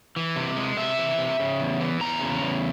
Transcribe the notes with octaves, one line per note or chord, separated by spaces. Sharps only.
E3
C3
G#3
C3 E5
E3
C3
C#3
E2
E3
E2 A#5
C#3
E2